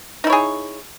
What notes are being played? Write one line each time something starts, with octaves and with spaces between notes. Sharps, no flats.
D#4 E4 G#4 C#5